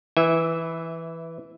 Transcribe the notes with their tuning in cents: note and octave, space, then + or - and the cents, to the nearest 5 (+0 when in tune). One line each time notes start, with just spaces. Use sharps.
E3 +0 E5 -15 G#5 -20